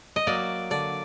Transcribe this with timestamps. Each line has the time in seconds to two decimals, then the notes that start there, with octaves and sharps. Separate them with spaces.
0.16 D#5
0.27 F#3 A#3 D5
0.70 D3 D5